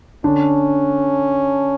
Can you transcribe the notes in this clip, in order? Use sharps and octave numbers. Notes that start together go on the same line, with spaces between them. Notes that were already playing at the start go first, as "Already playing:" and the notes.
D3 C#4 D4